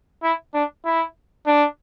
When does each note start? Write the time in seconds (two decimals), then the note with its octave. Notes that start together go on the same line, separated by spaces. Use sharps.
0.23 E4
0.54 D4
0.85 E4
1.47 D4